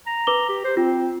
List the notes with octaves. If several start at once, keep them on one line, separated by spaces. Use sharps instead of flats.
A#5
B4 D6 G7
G4
C5
C4 F4